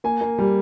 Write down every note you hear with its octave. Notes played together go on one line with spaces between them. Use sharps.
A#3 G#5
A#3
G3